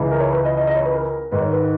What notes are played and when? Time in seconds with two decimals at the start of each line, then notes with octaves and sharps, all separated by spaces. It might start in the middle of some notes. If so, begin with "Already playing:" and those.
Already playing: C#2 C#3 E3
0.11 A#4
0.21 C#5
0.32 B4
0.45 D#5
0.57 D#5
0.67 D#5
0.76 C#5
0.85 B4
0.95 A#4
1.31 G#2 D#3 B4
1.41 C#5
1.52 B4